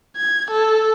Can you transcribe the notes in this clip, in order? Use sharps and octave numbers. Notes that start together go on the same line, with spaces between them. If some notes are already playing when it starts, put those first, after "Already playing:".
G#6
A4